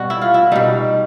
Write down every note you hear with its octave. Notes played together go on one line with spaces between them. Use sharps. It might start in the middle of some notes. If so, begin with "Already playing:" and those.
Already playing: B2 G3 F#4
E4
F4
E4
B2 G3 D#4